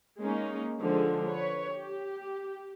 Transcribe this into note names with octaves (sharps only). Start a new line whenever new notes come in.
G#3 A#3 C#4 D#4
D3 F3 G#3
B4 C#5
G4